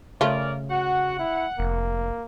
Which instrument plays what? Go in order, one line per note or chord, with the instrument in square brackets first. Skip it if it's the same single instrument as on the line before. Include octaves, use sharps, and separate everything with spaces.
[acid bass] C#3 [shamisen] A3 F4 [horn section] A#4 C#5 D5
[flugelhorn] F#4 [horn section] F#5
[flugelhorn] E4
[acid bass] F1 [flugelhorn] A#3